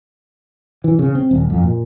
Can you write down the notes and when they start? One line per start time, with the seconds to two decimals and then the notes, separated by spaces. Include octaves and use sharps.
0.84 E3
0.99 C#3
1.15 C4
1.31 D#1
1.50 F2
1.63 A#2